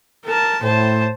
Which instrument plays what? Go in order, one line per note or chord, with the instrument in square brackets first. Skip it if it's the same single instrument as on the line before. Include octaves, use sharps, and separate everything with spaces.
[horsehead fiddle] A#4 A5
[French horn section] A2 [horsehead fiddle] C5 A5